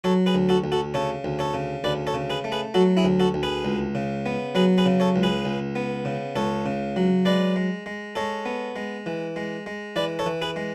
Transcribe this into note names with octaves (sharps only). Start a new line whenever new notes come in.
F#3 A4 C#5
G#4 B4
D2
F#4 A4
D2
F#4 A4
C#3 A4 C#5
D2
A4 C#5
C#3
D2 B4 D5
A4 C#5
C#3
G#4 B4
A3
G#4 B4
F#3 F#4 A4
E4 G#4
D2
F#4 A4
D2
G#4 B4
C#2
C#3
B3
F#3 G#4 B4
G#4 B4
C#3
A4 C#5
C#2
G#4 B4
C#2
B3
C#3
C#2 A4 C#5
C#3
F#3
G#3 B4 D5
G#3
G#3
G#3 A4 C#5
B3
G#3
E3
G#3
G#3
E3 B4 D5
A4 C#5
E3
G#4 B4
G#3